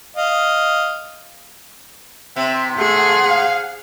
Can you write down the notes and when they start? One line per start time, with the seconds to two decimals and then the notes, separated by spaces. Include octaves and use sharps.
0.16 D#5 F5
2.36 C3 C4 E5
2.78 A3 G#4 F#5
3.28 F5